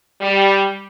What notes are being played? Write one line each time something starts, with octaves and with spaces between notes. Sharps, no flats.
G3